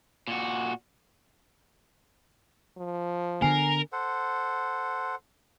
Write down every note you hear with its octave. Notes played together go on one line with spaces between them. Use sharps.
A#2 F#4
F3
D3 B3 A#4 G#5 C7
A4 C5 F#5